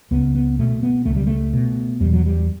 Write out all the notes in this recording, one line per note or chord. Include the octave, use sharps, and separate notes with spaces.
C#2 B3
B3
B2 A3
B3
C#2 A3
G3
A3
B2
E2 G3
F#3
G3